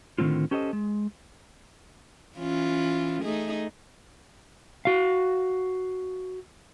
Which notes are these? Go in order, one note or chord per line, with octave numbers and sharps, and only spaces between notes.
A2 D3 D#3 A#3 C4 F4
C#4 G4 A4 C5 D5 D#5
G#3
E3 C#4 F4
A3 D#4 G#4
F#4 F5